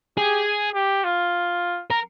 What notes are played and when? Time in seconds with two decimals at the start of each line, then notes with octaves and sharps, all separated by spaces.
0.17 G4 G#4
0.75 G4
1.04 F4
1.90 A#4